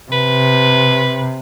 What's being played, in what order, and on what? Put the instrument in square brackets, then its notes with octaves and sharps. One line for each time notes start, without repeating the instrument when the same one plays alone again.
[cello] C3 [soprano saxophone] B4